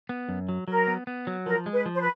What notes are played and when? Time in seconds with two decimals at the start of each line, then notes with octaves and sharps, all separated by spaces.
0.09 B3
0.29 F#2
0.49 F#3
0.68 F#3 A#4
0.87 B3
1.07 B3
1.27 F#3
1.46 F3 A#4
1.66 G#3
1.72 B4
1.86 F3
1.94 C5
1.99 B4